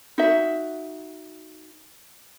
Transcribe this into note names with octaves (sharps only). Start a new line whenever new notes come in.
D#4 F#4 E5